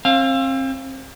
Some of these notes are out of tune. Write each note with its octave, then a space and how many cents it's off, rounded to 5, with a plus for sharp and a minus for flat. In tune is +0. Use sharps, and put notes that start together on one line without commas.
C4 +35 F5 +0